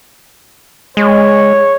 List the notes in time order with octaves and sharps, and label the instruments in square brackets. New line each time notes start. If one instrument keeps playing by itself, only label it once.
[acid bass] G#3 [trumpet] C#5